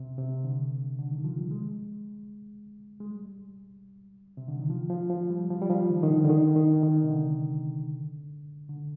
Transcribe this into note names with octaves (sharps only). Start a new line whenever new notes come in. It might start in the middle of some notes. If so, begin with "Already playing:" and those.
Already playing: C3
C3
D3
D3
D#3
F3
G3
G#3
G#3
G3
C3
D3
D#3
F3
F3
F3
G3
F3
G3
F3
D#3
D#3
D3
D3
D#3
D#3
D#3
C3
D3
D3